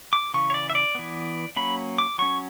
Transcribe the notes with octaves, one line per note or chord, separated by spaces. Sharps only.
D6
C#3 E3 C#6
C#5
D5
E5
D5
E3 B3
F#3 A#3 C#4 B5
D6
F#3 C#4 C#6